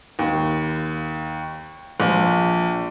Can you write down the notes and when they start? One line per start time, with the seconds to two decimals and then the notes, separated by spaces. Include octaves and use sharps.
0.19 D#2
2.00 A#1